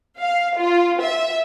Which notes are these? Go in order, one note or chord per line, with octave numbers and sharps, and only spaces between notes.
F5
F4
E5